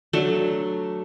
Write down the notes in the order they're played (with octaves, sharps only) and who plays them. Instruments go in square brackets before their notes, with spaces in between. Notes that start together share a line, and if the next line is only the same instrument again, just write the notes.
[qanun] F#3 A3 D4